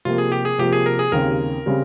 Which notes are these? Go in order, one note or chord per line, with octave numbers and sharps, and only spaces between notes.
C3 F3 A#3 F4
G#4
G4
G#4
C3 F3 A#3 G4
G#4
A#4
G#4
D#2 C#3 G3 C4 A#4
C#3 G3 C4